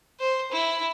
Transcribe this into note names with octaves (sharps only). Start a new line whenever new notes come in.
C5
E4